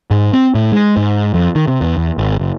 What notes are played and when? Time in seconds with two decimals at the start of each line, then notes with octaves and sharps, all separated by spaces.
0.11 G#2
0.33 C4
0.55 A2
0.72 G#3
0.97 G#2
1.34 F2
1.55 D#3
1.67 C3
1.81 E2
1.97 E2
2.18 G#1
2.40 F#1